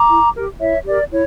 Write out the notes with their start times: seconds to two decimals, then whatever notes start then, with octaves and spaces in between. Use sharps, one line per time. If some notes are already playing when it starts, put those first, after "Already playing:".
Already playing: A#5 D6
0.09 E4
0.34 G4 A#4
0.59 E4 C#5 E5
0.85 G4 A#4 D5
1.11 E4 C#5